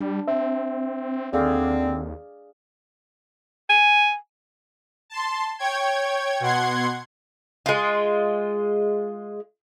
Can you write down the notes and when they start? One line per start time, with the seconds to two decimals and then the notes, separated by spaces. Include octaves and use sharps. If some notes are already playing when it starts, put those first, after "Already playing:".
0.01 G3 D4
0.28 C4 E5
1.33 D#2 D3 C4 G#4 D5 F5
3.69 G#5
5.10 A5 C6
5.59 C#5 G5 G#6
6.40 B2 F#5 C6 G#6
7.66 G#3 F4